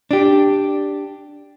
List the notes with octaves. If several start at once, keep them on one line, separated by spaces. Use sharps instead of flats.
D4 G4